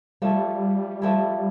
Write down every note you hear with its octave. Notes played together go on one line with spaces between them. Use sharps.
F3 G3 A3 E4
F3 A3 E4